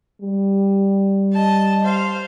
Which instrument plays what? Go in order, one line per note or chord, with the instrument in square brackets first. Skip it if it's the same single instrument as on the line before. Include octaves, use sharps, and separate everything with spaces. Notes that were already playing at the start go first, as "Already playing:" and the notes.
[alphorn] G3
[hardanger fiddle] D#5 A5
C5 F5